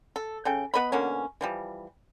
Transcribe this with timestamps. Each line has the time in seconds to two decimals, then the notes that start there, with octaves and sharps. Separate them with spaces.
0.16 A4
0.45 C#3 A4 G5
0.74 B3 B4 D#5 B5
0.92 B2 D3 A#3 C#4
1.41 E3 F3 G3